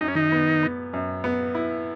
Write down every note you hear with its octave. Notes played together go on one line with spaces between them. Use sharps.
F#2 D#4
C#4
D#3 D#4
B3
B3
F#2
B3
E4